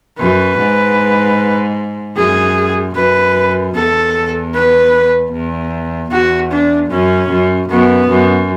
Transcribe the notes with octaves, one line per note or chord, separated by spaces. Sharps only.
F#2 B4
G#2
F#2 G#4
F#2 B4
E2 A4
B4
E2
E2 F#4
D4
F#2 C#4
F#2
F#2 B3
F#2